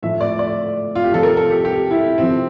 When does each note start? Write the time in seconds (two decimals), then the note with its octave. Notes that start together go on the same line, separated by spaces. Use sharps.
0.03 A2 F3 E5
0.21 D5
0.39 D5
0.95 F4
1.04 G4
1.10 C3 F3 A4
1.23 A#4
1.37 A4
1.51 G4
1.65 G4
1.91 E4
2.18 C3 F3 C4